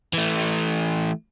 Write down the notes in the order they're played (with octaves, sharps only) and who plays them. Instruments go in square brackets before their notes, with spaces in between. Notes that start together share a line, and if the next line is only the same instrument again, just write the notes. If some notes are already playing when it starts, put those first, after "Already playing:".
[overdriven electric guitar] E3 A3